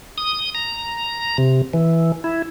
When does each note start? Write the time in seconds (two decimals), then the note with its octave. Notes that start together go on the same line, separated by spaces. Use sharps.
0.18 D#6
0.55 A#5
1.38 C3
1.73 E3
2.24 E4